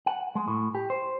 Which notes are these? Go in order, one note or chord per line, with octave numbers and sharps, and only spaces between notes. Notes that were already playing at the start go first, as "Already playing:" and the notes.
F#5
G#3
A2
G4
C5